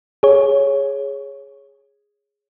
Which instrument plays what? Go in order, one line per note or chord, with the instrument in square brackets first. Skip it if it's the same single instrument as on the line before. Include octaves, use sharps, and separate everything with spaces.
[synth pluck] G#4 C#5